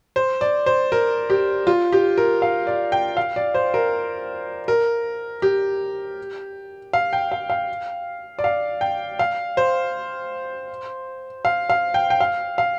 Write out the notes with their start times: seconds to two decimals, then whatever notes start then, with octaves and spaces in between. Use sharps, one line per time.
0.16 C5
0.41 D5
0.66 C5
0.92 A#4
1.30 G4
1.67 F4
1.92 G4
2.18 A#4
2.42 F5
2.67 D5
2.92 G5
3.17 F5
3.36 D5
3.54 C5
3.74 A#4
4.68 A#4
5.42 G4
6.93 F5
7.13 G5
7.32 F5
7.50 F5
8.39 D5
8.44 F5
8.81 G5
9.19 F5
9.57 C5
11.45 F5
11.70 F5
11.94 G5
12.10 G5
12.20 F5
12.58 F5